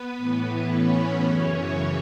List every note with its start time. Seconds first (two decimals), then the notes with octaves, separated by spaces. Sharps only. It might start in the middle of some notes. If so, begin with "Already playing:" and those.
Already playing: B3 B4
0.17 A2 E3
0.69 C#4 C#5
1.22 F#2 C#3 E3